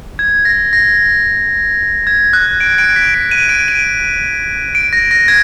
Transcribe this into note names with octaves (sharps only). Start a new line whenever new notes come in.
G#6
A#6
A#6
G#6
F#6
D7
D7
B6
D7
D#7
D7
D#7
D7
A#6
A#6
G#6